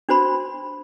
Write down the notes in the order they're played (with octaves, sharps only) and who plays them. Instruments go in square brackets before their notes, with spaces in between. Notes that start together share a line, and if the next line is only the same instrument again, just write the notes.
[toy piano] D4 F#4 C5 B5 C6